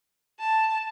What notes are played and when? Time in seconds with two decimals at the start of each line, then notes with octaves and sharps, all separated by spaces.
0.40 A5